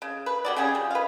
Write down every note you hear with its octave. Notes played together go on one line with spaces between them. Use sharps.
C#3
B4
G3 F#4 D5
C#3 G3 C#4 G#4
F3
B4 F5